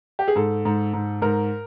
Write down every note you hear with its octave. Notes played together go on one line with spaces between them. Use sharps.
G4
G#4
G#2 A4
G#2
G#2
G#2 A#4